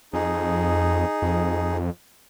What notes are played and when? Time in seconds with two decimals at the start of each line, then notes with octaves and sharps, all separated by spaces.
0.13 F2 D#4 G#4
1.22 F2